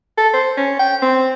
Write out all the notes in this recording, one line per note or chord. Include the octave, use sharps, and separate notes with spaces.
A4
C5
C#4
G5
C4